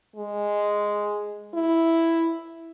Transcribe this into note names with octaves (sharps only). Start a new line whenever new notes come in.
G#3
E4